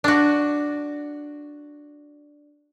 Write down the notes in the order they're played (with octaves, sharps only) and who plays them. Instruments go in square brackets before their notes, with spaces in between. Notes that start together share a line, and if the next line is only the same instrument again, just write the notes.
[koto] D4 F#4